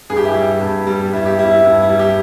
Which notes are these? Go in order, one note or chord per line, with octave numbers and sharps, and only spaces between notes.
G2 G#4
G4
E4
G3 G4
G2
G3
G2 E4
G4
G3 E4
E4
G2
E4
G3
G4